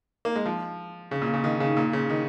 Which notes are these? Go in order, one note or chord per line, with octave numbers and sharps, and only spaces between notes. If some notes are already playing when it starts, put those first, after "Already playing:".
A#3
G#3
F3
C#3
A#2
C#3
D#3
C#3
A#2
C#3
D#3